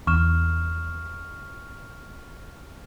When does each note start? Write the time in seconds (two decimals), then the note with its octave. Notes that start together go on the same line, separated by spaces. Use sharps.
0.07 E2 C#6 F6 E7